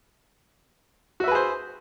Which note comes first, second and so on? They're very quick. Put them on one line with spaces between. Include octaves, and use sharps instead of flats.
F#4 E5 B4 G#4 C5